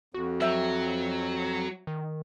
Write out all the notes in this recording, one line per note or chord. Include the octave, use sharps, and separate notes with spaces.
F2 F#4
F#3 C4 E5 G5
D#3